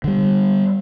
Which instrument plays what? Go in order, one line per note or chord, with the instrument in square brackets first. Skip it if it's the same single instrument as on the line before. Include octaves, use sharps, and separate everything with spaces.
[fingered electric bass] D3 G3